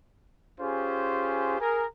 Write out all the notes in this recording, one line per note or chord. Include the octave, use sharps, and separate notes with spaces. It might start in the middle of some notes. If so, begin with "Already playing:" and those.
C#4 F4 G4 G#4 C5
G#4 A#4